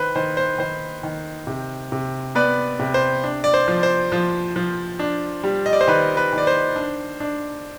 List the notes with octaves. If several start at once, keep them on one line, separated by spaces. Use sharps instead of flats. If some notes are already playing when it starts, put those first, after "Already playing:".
Already playing: D#3 B4 C5
D#3 C5
C5
D#3 C5
D#3
C3
C3
B3 B4 D5
C3
C5
D4
D5
C5
F3
C5
F3
F3
D4
G3
D#5
D5
C5
D#3 B4
B4
D#3 D5
C5
D4
D4